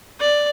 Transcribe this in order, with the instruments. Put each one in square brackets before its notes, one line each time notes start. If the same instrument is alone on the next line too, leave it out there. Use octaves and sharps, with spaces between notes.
[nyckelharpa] D5